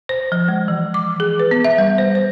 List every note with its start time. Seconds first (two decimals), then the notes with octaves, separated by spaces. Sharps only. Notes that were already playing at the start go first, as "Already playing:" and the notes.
0.09 C5
0.32 F3
0.48 G#3
0.68 E3
0.94 D6
1.20 G#4
1.40 B4
1.51 B3
1.64 E5
1.78 G3
1.98 C5
2.15 C5